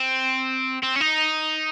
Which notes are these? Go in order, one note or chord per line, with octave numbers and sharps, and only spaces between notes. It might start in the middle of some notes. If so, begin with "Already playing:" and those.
Already playing: C4
C4
C#4
D#4